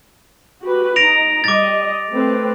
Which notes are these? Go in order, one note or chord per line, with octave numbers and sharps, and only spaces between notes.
F#4 G4 B4
D#4 A#5 A#6 D7 F7
G3 D#5 D6 A6
A3 C4 B4